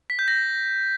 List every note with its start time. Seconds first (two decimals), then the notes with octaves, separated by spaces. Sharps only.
0.10 B6
0.19 G6
0.28 A#6